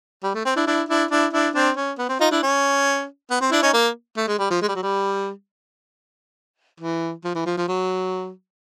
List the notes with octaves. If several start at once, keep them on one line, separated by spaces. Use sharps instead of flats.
G3
A3
C4
D4 E4
D4 E4
D4 E4
D4 E4
D4 E4
C4 D4
C#4
B3
C4
D#4 F4
D4 E4
C#4
B3
C4
D4 E4
C#4 D#4
A#3
A3
G#3
G3
F3
G#3
G3
F#3
G3
E3
F3
E3
F3
F3
F#3